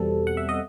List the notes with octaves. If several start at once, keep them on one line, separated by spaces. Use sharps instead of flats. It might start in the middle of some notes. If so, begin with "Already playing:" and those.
Already playing: E2 B2 G3 C4 A4
F#5
E5
D#5